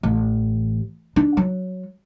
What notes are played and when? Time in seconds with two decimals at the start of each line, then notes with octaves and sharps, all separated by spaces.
0.03 A1
1.16 D4
1.37 F#3